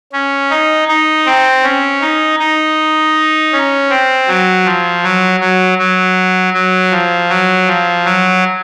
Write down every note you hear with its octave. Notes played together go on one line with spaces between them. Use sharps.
C#4
D#4
D#4
C4
C#4
D#4
D#4
C#4
C4
F#3
F3
F#3
F#3
F#3
F#3
F3
F#3
F3
F#3